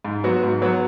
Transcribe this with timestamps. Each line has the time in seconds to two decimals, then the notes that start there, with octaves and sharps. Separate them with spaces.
0.05 G#2
0.24 F#3 B3 F#4
0.43 G#2
0.62 F#3 B3 F#4